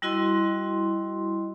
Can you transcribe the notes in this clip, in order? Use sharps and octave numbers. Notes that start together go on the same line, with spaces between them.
G3 E4 F#4 D#5 C6